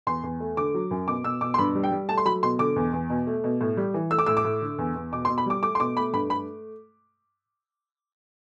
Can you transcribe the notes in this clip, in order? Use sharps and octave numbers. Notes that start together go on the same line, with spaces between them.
E2 C6
E2
A3
D3 D6
F#3
F#2
B2 D6
B2 E6
B2 D6
C6
G2 B5
G3
G5
G3
A3 A5
C6
F#3 B5
B2 C6
D3 D6
E2
E2
B2
A3
B2
A2
G3
E3
A3 E6
D6
A2 E6
D6
A2
D3
E2
E2
B2 D6
C6
B2
B5
G3 D6
A3 D6
C6
B2 D6
A3 B5
G2 B5
A3 B5